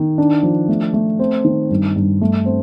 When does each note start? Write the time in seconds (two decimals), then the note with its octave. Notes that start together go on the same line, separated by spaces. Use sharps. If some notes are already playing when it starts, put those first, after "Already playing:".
Already playing: D#3
0.18 D4
0.43 F3
0.69 A3
0.94 A3
1.19 C4
1.45 D#3
1.71 G2
1.96 G2
2.21 A3
2.46 C4